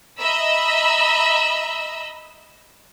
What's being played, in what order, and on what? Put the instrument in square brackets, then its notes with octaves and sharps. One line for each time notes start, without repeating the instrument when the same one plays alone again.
[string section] D#5 E5 A#5 B5 E6